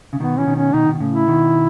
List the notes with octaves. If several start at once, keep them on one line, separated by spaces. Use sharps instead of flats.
C#3
B2 D#3 B3
E3 C#4
B2 D#3
C#4
B2 D#3 D#4
B2
A2 C#3
E4
B2 D#3